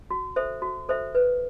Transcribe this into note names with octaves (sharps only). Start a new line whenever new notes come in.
F#4
A4 C5 E5
F#4
A4 C5 E5
B4